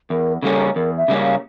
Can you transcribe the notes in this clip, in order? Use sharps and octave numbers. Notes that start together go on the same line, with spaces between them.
E2 A#4
C#3 G3 A#3 C#4 A4
E2 A#4
E5
C#3 G3 A#3 C#4
F5